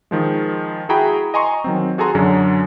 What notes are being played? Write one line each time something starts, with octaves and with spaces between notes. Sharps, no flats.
D#3 F3 G#3
E4 F#4 G#4 G5 A#5 B5
D#5 G#5 A#5 C6 C#6
D#3 F#3 C4
F#4 G#4 A4 G#5 A#5 C6
F#2 D3 F#3 C#4